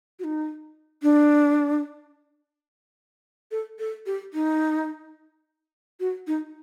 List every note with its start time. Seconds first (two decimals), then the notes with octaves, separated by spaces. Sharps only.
0.19 F#4
0.24 D#4
1.03 D4
3.51 A4
3.79 A4
4.06 G4
4.34 D#4
6.00 F#4
6.27 D#4